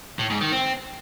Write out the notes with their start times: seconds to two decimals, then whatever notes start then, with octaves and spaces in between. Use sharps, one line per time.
0.19 A2
0.30 G#2
0.41 D#3
0.52 C4